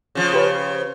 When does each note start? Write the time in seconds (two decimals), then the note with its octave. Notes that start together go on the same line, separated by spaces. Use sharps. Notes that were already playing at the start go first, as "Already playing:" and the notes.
0.15 C#3 F3
0.34 G4 B4 C#5